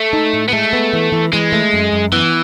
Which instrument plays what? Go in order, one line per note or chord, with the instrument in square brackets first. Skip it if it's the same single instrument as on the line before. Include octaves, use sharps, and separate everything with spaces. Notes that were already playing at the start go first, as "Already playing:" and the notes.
Already playing: [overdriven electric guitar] A3
[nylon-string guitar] D#4
A2
[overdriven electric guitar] B3
[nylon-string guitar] G#3 [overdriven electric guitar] A3
[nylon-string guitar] B3
E3
E3
[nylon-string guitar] E3 [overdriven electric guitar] G#3
[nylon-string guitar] A3
F#2
F#2
[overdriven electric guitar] E3 [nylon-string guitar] B3